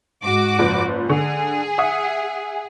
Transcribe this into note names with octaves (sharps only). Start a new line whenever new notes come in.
G#2 F#4 D6
F#1 F3 B4
D3 G#4
E5 F#5 D#6